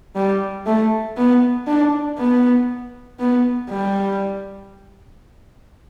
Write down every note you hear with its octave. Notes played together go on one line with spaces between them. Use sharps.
G3
A3
B3
D4
B3
B3
G3